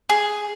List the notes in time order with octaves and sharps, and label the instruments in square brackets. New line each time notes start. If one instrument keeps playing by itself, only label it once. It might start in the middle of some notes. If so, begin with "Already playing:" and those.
[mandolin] G#4